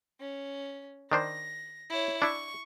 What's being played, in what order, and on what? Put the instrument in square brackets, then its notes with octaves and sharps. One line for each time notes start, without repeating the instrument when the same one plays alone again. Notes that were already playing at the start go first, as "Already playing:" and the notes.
[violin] C#4
[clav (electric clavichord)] D#3 D4 C5 [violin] A#6
[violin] E4 C#5
[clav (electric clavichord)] D4 E4 [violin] C#6